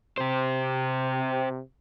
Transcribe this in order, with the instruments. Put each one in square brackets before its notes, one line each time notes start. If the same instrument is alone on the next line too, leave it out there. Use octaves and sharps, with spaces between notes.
[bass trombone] C3 [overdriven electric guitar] G4 C5